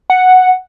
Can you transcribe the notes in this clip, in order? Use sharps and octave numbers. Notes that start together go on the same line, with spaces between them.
F#5